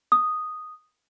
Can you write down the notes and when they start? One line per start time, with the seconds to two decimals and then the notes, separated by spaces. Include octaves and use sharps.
0.12 D#6